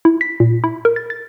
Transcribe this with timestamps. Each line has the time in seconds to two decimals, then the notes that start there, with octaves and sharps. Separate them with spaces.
0.05 E4
0.21 B6
0.40 A#2
0.64 E4
0.85 A#4
0.96 A6
1.10 A6